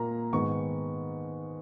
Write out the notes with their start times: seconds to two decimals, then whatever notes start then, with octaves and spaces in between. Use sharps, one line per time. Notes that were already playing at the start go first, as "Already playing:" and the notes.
Already playing: A#2 A#3 A#5
0.33 G#2 D#3 G#3 B3 C#6